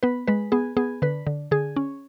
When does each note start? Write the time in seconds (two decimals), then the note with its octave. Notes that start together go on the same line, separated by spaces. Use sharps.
0.03 B3 B4
0.28 G#3 B4
0.52 B3 G#4
0.77 B3 G#4
1.02 D3 B4
1.27 D3
1.51 D3 G#4
1.76 C#4